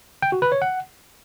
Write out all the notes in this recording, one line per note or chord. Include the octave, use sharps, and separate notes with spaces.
G5
F#4
B4
C#5
F#5